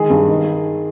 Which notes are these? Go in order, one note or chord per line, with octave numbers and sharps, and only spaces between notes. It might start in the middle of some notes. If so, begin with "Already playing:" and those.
Already playing: D#3 G#3 G#4
G2
D#3